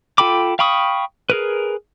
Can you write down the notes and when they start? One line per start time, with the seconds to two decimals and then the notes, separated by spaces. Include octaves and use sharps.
0.18 F4 A4 G5 B5 D6
0.59 F5 G5 B5 C#6 D#6
1.30 G#4 A#4 B4